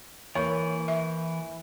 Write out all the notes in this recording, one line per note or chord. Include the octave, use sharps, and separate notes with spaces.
E3 A#3 C#5 C#6 G6
E5